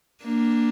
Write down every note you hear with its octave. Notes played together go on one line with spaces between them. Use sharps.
A#3 D4